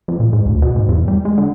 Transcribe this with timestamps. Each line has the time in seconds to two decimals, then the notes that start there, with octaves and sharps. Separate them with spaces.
0.08 F2
0.20 A#2
0.33 G#2
0.46 D2
0.62 B2
0.76 G#2
0.89 E2
1.08 G3
1.25 G#3
1.38 D3